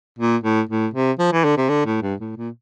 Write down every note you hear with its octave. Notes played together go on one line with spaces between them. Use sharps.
A#2
A2
A2
C3
F3
E3
D3
C3
D3
A2
G2
A2
A#2